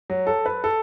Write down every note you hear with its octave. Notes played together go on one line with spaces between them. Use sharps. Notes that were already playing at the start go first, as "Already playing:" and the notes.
F#3
A4
B4
A4